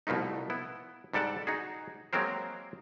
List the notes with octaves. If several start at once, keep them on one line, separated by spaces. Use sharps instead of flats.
C2 B2 F3 A3 D#4
B3 E4
G#2 G3 A4 D5 F#5 A5
D#4 F#4 G#4
F#3 G#3 A#3 C4 A#4 C5